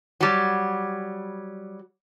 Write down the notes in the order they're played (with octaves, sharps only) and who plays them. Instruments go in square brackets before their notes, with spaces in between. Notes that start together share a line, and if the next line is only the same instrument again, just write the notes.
[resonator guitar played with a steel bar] F#3 G3